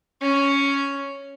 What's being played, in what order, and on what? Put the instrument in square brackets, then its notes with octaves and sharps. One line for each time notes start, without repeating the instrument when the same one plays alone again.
[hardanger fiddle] C#4